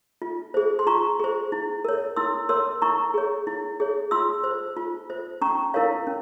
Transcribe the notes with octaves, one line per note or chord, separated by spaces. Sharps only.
F4
G#4 C5
C6
F4 A#5 C#6
G#4 C5
E4
A#4 C#5
E4 C6 E6
A#4 C#5 C6 E6
E4 A#5 C#6
G#4 C#5
E4
G#4 C#5
F4 C6 E6
C5
F4
C5
C#4 A#5 C#6
E4 A#4 C#5 F5
C#4